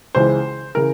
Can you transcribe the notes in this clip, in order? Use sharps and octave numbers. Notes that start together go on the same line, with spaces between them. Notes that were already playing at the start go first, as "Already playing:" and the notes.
C#2 C#3 E3 C5
C#3 E3 A#4